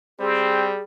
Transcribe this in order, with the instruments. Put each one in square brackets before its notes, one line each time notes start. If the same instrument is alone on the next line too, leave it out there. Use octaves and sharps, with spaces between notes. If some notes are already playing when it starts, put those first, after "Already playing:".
[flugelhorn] G3 [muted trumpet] C4 [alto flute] G#4